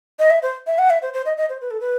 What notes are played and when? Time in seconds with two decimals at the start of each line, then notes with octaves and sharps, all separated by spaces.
0.19 D#5
0.30 E5
0.42 C5
0.67 E5
0.78 F#5
0.90 E5
1.02 C5
1.13 C5
1.25 D#5
1.37 D#5
1.49 C5
1.61 B4
1.71 A4
1.80 B4